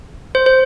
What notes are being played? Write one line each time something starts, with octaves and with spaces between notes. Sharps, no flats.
C5
C5